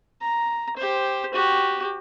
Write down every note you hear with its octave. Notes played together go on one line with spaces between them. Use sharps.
A#5
G4 C5
F#4 G4